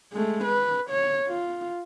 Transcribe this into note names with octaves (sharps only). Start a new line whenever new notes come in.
G#3 A3
B4
C#5
F4